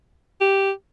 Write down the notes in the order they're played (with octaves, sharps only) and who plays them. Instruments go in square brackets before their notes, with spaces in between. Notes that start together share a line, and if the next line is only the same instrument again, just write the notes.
[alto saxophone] G4